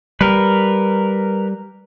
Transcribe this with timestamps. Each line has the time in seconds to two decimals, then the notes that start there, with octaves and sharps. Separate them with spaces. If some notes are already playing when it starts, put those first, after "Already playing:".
0.21 G3 A#4 B4